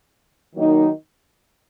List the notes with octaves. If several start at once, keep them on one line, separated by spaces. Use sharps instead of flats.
D#3 F#3 A#3 D#4